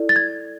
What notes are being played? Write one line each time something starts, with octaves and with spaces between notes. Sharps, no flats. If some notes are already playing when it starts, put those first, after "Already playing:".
Already playing: E4 A4 D5
A6
G#6